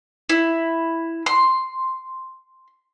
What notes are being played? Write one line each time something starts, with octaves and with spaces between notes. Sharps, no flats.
E4
C6